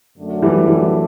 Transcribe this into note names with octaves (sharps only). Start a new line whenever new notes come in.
F#2 D3 F#3 A3
E3 G3
E3 G3